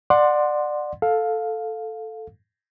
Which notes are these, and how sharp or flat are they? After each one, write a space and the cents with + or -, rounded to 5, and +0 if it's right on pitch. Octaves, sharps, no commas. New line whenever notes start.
D5 +20 F#5 -15 C6 +0
A4 +0 F5 +15